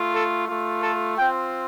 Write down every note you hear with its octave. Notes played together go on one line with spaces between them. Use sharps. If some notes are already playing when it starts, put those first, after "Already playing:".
Already playing: A3 F4
A4
A3 F4
A4
C4 F4 G5